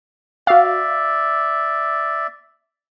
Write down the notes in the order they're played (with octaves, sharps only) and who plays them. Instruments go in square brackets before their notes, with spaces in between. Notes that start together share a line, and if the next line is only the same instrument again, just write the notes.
[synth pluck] F#4 F5 [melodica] D5 E5